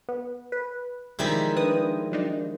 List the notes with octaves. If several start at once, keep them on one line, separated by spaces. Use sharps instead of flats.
B3
B4
C2 D#3 F3 G3 G#3 C4 E4 B6
D4 B4 D#6
F#3 D4 D#4